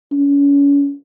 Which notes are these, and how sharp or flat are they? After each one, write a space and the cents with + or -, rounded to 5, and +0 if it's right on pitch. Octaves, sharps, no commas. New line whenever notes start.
C#4 +35